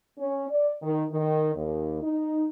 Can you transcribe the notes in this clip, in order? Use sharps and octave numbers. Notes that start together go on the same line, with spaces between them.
C#4
D5
D#3
D#3
D#2
D#4